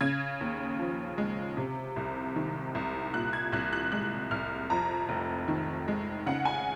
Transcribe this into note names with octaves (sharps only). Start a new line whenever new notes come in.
C#3 G#6
D#2
F3
G#3
C3
C2
D#3
C2
A#2 F#6
G#6
C2 F#6
F#6
G#3 F#6
C2 F6
F2 A#5
F1
D#3
G#3
C#3 F#5
G#5